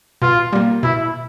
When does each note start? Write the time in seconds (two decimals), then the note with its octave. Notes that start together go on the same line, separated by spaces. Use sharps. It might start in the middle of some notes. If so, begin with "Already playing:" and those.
0.22 B2 F4
0.53 G3 A#3
0.83 B2 E4